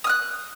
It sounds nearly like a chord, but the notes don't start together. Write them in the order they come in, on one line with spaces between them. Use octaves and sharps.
D#6 F6 F#6